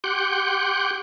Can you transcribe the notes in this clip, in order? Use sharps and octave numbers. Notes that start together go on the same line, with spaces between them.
G4 F#5 G5 C6 F#6 G6